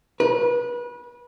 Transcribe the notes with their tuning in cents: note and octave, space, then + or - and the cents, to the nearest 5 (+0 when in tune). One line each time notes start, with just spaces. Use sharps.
B4 -30